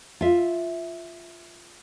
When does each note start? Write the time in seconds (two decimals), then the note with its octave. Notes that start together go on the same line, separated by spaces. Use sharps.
0.21 F4 E5